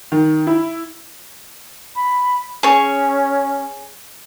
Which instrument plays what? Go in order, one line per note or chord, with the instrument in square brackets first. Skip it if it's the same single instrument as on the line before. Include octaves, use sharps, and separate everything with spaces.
[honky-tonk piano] D#3
E4
[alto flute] B5
[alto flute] C#4 [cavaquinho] G#4 C#5